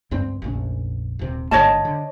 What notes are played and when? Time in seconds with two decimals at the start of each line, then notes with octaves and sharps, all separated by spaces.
0.11 C#2 G2 C4
0.42 F1 A#1 C#4
1.19 D#1 C3
1.51 G1 G#2 D3 C#5 D#5 A5
1.85 D3